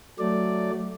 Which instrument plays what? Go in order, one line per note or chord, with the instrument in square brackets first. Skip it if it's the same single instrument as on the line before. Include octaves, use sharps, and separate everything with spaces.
[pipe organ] F#3 A3 D5